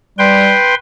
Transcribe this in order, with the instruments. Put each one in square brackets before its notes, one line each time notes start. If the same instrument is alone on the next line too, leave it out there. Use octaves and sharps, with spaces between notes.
[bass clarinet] G3 [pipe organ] B4 G5 C6